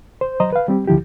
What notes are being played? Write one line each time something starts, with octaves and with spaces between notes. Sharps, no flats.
C5
F#3 C5 D#5 A#5
B4 F5
G3 C4 G4
D2 D3 F3 E4 G4